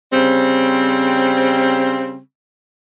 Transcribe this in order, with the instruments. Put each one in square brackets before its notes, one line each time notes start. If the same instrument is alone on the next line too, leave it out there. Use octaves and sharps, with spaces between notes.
[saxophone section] C#3 G3 C4